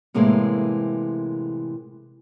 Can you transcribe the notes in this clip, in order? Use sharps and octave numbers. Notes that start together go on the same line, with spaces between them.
A2 C3 E3 G#3 A#3